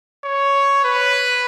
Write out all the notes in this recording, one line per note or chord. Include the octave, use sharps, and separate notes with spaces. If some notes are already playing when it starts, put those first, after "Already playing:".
C#5
B4